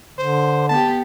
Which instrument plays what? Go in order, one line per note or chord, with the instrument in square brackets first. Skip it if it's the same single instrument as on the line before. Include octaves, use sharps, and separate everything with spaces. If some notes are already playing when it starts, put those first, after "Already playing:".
[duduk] D3 [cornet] C5
[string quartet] B3 G4 [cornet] A5